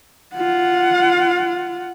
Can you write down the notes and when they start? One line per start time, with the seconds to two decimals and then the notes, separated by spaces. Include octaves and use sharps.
0.36 F4 F#5